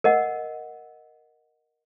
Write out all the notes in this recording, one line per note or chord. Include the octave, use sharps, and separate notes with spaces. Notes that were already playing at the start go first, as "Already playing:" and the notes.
A#4 D#5 F#5